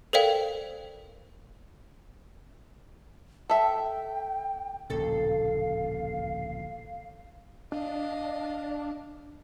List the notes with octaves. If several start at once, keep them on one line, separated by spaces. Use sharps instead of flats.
A4 A#4 C5 D5 F5 G5
A4 E5 G5
D1 A#1 D#2 C#3 A4 F5
D4 D#5 F5